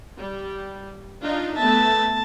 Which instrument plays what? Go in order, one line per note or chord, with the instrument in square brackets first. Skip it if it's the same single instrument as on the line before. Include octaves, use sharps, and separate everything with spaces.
[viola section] G3
D4 D#4 F4
[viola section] A3 B3 E5 [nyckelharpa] A5